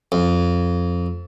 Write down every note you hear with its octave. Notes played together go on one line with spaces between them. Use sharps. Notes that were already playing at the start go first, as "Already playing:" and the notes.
F2